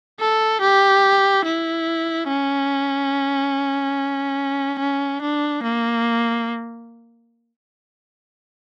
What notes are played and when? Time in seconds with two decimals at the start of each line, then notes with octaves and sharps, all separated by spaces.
0.20 A4
0.62 G4
1.45 E4
2.29 C#4
4.79 C#4
5.22 D4
5.63 A#3